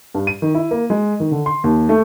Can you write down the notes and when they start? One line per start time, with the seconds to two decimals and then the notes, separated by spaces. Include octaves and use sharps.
0.14 G2
0.27 D#7
0.42 D#3
0.55 E4
0.71 A#3
0.90 G#3
1.20 D#3
1.31 D3
1.46 C6
1.64 D#2
1.89 A3